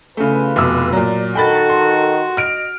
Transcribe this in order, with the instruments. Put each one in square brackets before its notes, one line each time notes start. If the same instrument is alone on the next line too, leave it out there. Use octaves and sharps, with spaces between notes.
[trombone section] E2 F4 B4 [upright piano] C#3 A3 [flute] G#5
[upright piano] F1 B2 E6 [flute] D6
[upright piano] A#2 F#3 [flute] D5
[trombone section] D#3 [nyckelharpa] F#4 [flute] A4 [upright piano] G5 B5 A6
[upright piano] C6
[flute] D#5 [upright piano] F6 D7